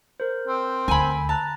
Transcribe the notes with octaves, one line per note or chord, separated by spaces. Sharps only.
A#4 C5
C4
D2 G#5 B5
A5 A#5 F#6